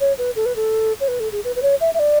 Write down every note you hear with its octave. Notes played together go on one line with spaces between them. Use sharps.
C#5
B4
A4
B4
A4
C#5
B4
A4
G#4
B4
B4
C#5
E5
E5
D5